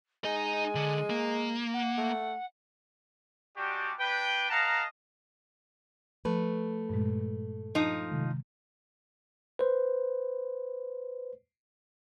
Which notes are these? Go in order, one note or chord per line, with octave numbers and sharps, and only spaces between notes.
G#3 D#4 D#5 G#5
D3
A#3
F#5
A3
G3 G#3 D4 F#4 G4
D4 B4 G5
A#4 D#5 F5 F#5 A5 A#5
F3 A3 B4
G2 A#2 G#3
F3 D#4
C3 D#3 G#3
B4 C5